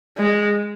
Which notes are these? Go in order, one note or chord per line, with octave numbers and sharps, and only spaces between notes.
G#3